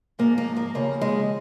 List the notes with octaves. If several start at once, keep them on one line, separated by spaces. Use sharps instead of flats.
G#2 F3 A#3
A#3
A#3
D#2 C#3 F3 A#3
G#3